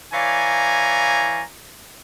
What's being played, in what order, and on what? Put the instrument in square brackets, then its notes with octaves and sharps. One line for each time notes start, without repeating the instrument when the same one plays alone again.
[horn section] E3 C#5 D5 F5 G#5 A#5